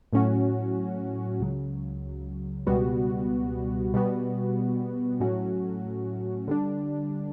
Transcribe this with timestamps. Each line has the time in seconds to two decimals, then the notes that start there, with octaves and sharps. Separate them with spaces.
0.13 A2 F#3 C#4 F#4
1.40 C#2 C#3 F#3
2.67 C#2 B2 G3 B3 F#4
3.94 B2 G3 B3 F#4
5.20 A2 F#3 A3 C#4 F#4
6.48 D3 G3 D4